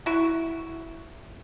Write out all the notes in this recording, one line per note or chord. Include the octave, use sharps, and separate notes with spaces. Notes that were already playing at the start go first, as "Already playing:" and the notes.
E4 F#4